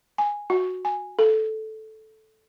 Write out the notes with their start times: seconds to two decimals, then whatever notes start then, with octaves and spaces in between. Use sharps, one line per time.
0.18 G#5
0.50 F#4
0.85 G#5
1.19 A4